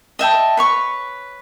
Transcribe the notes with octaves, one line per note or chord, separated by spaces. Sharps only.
D#5 E5 G5 A5
B4 C#5 C#6